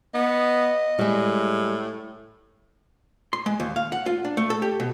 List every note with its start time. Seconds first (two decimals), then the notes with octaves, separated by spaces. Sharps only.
0.14 B3 D#5
0.99 A2 G3 G#3
3.33 C6
3.46 G#3
3.60 D#2
3.76 F5
3.92 F#5
4.06 F4
4.25 D4
4.37 A3
4.50 A4
4.62 G4
4.80 B2